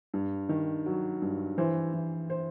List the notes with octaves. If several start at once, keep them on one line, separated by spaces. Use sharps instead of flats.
G2
D#3
F#3
G2
E3 C5
E3
C5